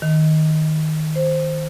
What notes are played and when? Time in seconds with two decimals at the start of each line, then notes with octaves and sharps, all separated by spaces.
0.02 D#3
1.16 C5